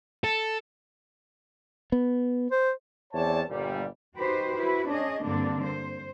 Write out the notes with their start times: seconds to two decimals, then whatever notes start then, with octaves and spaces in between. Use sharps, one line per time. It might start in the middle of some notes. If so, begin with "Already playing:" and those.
0.24 A4
1.92 B3
2.51 C5
3.13 E2 C4 C#5 D5 A5
3.49 G1 A#2 G3
4.17 D#4 F#4 G4 B4 C5
4.57 E4 F#4 B4
4.89 C#4 D4 G#4 D#5
5.24 G2 D3 A#3 C4 D4
5.64 C5